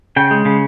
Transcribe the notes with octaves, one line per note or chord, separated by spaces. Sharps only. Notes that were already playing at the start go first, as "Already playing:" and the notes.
C#3 G5
G#3
C#3